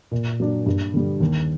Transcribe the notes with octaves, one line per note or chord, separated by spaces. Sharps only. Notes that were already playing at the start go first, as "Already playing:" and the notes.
A#2
F#3 A#3 D4
G2
D3 G3
D#2